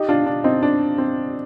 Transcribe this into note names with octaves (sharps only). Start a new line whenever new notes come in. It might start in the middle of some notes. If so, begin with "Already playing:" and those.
Already playing: D#4 G4
D4 F4
D4
C4 D#4
D4
C4